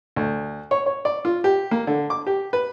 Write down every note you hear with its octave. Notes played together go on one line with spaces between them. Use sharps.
D2
C#5
C#5
D5
F4
G4
A#3
D3
D6
G4
B4